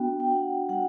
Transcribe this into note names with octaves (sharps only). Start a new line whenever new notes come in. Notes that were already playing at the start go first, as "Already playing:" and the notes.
Already playing: B3 D4 F#4 G5
G5
F#4 F#5
G3 F#5